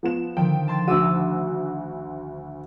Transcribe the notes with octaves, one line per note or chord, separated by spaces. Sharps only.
F3 B3 E7
D3 D#3 F3 G5
A5 C6 A6
D2 F#4 D6 E6 D#7